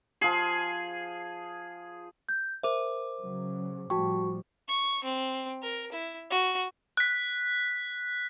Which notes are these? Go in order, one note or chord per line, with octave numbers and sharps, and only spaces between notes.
F3 G#4
G6
A#4 C5 E5 D6
C#3 F#3
A2 F3 G3 F#4 G5 A5 C#6
C#6
C4
A#4
E4
F#4
F#6 B6